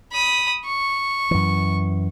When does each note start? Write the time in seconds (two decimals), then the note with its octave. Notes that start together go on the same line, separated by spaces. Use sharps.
0.12 B5 D#6
0.65 C#6
1.31 F#2 E3